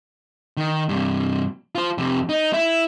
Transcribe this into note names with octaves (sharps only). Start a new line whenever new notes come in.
D#3
G2 C3
F4 C5
F2 C3
D#4
E4